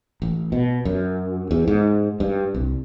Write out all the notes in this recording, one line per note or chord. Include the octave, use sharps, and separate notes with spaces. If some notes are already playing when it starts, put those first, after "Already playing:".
A1
B2
F#2
E2
G#2
G2
C2